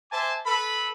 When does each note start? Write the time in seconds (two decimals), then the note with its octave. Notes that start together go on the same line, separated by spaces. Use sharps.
0.11 C5 E5 G#5 A5 D6
0.46 A4 B4 B5